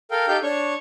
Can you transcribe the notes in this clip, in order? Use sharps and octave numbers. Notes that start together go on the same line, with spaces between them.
A4 A#4 F5 G5
D#4 G4 A4 F5 G5 G6
D4 C#5 C#6